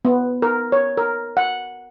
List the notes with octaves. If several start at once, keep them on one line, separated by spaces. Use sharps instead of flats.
B3
A#4
C#5
A#4
F#5